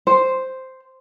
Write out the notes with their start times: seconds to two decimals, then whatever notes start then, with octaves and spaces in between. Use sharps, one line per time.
0.07 C5